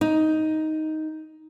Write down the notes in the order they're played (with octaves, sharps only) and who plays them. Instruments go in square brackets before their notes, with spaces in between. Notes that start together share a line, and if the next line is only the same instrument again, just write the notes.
[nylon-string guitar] D#4